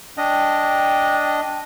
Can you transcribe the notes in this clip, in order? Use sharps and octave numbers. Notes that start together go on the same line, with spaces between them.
D4 D#5 G5